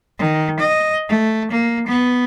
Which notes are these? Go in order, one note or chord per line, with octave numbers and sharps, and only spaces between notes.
D#3
D#5
A3
A#3
B3